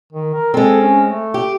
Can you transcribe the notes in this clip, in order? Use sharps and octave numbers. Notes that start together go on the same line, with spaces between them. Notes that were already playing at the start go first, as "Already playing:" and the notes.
D#3
A#4
G#3 C4 A4
C#4
A3
G4